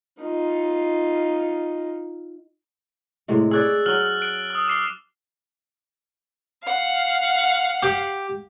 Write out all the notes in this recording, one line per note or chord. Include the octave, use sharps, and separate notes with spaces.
D#4 F4
A2 C3 G#3
G#4 C#5 D5 E6 F#6 A6
F#3 C#4 F6 F#6 F#7
F#6 D7 F#7
D#6 E6
D6 C7 G7
F5 F#5
G4